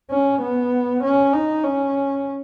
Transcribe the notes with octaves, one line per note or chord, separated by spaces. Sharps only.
C#4
B3
C#4
D#4
C#4